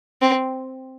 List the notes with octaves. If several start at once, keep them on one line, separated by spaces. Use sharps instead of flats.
C4